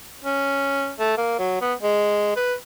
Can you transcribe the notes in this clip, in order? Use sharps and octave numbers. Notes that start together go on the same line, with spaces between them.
C#4
A3
A#3
F#3
B3
G#3
B4